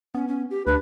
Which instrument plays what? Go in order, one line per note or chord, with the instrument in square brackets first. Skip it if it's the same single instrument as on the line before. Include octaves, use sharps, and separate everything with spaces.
[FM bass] B3 [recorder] C#4
[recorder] C#4
G4
[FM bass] D2 [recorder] D4 [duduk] B4